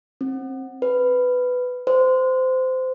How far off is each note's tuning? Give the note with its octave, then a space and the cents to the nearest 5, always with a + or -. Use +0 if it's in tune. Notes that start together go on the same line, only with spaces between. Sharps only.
C4 +25
B4 +10
C5 -20